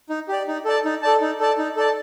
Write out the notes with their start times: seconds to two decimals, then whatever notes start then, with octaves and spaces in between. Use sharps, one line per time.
0.09 D#4
0.28 G4 D5
0.47 D#4
0.65 A4 D5 A5
0.85 D#4
1.02 A4 D5 A5
1.21 D#4
1.40 A4 D5 A5
1.58 D#4
1.76 A4 D5 A5